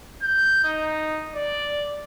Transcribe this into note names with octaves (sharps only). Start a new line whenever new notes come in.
G6
D#4
D5